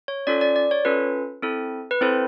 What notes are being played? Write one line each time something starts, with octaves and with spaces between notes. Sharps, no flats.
C#5
C#4 F4 A4 D5
D5
D5
C#5
C#4 F4 A4 B4
C4 E4 A4
B4
C4 E4 A4 C5